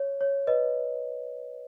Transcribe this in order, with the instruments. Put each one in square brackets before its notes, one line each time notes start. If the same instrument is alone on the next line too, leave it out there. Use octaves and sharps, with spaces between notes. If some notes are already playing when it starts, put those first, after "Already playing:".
Already playing: [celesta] C#5
C#5
B4 D#5